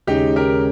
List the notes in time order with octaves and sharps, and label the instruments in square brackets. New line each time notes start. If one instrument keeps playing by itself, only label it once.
[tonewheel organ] D#2 C#3 G#3 C#4 G#4 [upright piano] D#4 G4
[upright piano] G4 A#4